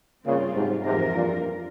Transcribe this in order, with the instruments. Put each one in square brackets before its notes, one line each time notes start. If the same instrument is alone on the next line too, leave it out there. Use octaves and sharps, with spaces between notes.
[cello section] G2 G3 C4 F4 [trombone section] A#2 C#3
[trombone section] G#2 C3
[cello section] F2 E3 A#3 F4 A#4 [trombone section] G#2 C3
[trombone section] G2 A#2